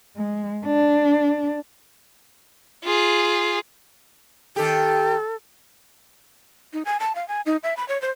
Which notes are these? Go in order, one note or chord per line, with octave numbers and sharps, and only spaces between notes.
G#3
D4
F4 G#4
D#3 G4 A4
D#4
G#5
A5
F5
G#5
D#4
E5
B5
C#5
C5